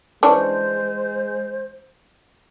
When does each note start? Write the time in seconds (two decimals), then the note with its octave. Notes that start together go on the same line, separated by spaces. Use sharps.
0.23 E3 G#3 C#4 D4 C5